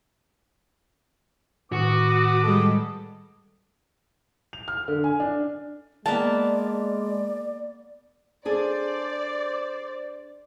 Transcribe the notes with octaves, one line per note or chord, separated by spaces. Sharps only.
A2 D#3 B3 F#4 D6 D#6
G3 G#3 A4
F7
F6
D3
G#5
D4
G#3 A#3 B3 D5 A5
D4 G#4 A4 C5 D5